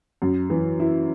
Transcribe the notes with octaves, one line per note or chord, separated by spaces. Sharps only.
F#2
E3
E4